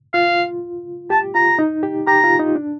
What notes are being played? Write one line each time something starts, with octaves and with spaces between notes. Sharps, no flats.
F4 F5
G4 A5
F4 A#5
D#4
G4
G4 A#5
F4
D#4
D4